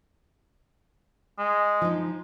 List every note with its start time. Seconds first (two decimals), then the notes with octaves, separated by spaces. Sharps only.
1.39 G#3
1.82 F3 D#4